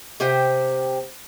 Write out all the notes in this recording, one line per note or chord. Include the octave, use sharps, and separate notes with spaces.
C3 G4 C5 F#5 G5